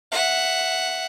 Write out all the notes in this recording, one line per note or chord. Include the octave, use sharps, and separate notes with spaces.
E5 F#5